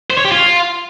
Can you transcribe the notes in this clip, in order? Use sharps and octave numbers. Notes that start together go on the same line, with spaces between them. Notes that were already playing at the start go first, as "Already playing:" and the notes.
C5
C#5
G4
F4